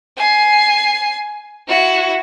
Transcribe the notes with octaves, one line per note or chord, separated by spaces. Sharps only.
G#5 C7
E4 F#4